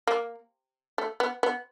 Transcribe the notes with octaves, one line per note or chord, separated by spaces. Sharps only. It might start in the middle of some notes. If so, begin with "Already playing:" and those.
A#3
A3
B3
B3